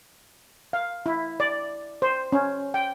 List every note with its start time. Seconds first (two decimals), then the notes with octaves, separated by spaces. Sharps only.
0.73 F5
1.06 E4
1.40 D5
2.02 C5
2.32 C#4
2.74 G5